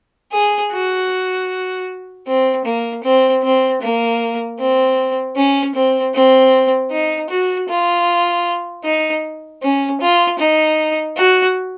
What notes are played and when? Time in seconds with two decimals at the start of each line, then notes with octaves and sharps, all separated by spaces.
0.33 G#4
0.72 F#4
2.27 C4
2.65 A#3
3.03 C4
3.43 C4
3.81 A#3
4.59 C4
5.36 C#4
5.75 C4
6.14 C4
6.91 D#4
7.30 F#4
7.69 F4
8.84 D#4
9.62 C#4
10.01 F4
10.39 D#4
11.17 F#4